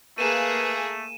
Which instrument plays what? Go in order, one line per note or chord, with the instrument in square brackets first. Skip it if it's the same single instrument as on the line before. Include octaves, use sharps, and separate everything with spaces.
[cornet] A3 [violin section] A#3 G#4 [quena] B4 [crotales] D#7 E7